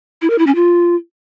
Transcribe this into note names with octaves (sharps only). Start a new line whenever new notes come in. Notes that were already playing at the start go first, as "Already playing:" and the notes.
E4
A#4
E4
C#4
F4